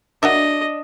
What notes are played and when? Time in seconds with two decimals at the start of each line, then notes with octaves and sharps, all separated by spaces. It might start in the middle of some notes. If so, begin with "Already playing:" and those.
0.23 D4 F#4 A#4 D#5 E5